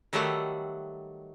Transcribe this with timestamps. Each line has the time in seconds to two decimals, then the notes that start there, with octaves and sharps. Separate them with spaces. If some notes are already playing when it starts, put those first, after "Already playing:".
0.13 D#3 F#3 G3 A3 E5 F#5